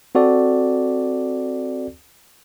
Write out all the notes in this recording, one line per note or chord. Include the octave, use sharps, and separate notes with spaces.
C4 F#4 A4 D5